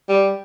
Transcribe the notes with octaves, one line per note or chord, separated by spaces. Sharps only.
G3